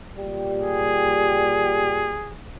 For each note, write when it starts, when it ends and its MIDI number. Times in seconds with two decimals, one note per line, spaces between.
0.18 2.22 46
0.18 2.22 55
0.18 2.22 67
0.61 2.39 68